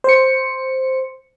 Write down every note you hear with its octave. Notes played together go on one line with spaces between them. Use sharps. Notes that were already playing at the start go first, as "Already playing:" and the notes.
C5 C#7